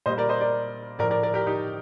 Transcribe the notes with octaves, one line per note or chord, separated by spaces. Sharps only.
A#2 G3 C5 D#5
A#4 D5
C5 D#5
A#4 D5
A2 F3 A#4 D5
A#4 D5
A#4 D5
G4 A#4
D#4 G4